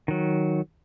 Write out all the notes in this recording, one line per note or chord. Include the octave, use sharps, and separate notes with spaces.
D#3 F#3